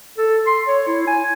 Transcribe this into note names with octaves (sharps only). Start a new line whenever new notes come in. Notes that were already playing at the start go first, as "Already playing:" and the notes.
A4
C6
C#5
E4
G#5